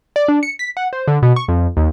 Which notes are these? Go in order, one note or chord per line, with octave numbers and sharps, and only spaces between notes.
D5
D4
C#7
B6
F#5
C5
D3
B2
C#6
F2
D#2